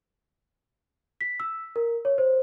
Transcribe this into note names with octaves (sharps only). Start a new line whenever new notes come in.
B6
E6
A#4
C#5
C5